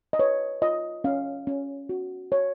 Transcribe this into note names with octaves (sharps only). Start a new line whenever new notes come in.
D#5
B4 C#5
F4 D#5
C#4 F5
C#4
F#4
C#5